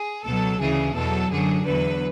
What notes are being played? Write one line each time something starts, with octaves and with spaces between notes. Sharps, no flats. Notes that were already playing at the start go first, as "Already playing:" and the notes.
Already playing: G#4
C#2 B2 F#3 A4
D2 C#3 E3 G#4
E2 B2 F#3 A4
F#2 D3 F#3 G#4
E2 D3 F#3 B4